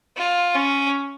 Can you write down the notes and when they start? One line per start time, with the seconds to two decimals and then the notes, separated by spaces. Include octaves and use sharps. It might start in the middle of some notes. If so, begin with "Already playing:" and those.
0.17 F4
0.55 C#4